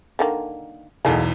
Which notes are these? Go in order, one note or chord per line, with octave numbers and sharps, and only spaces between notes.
D3 D#3 A#3
B1 E2 B2 G#3 A#3 A4